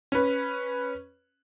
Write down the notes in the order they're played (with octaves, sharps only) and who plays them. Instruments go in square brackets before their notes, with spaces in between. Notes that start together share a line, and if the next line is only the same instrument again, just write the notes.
[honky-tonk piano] C#4 B4